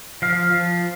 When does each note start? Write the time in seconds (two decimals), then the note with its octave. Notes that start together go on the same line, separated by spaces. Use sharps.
0.22 F3 F5
0.52 F3